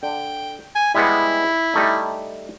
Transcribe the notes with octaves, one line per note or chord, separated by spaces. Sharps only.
D3 G5
G#5
G3 G#3 B3 E4
G3 A3 D#4